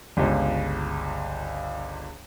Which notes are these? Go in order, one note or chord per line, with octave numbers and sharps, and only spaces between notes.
G1 C#2